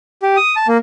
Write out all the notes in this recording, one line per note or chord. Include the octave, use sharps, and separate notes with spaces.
G4
D#6
A5
A#3